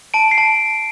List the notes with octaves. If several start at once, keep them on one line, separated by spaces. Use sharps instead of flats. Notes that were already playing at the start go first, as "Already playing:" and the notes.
A5 D7
C7
A5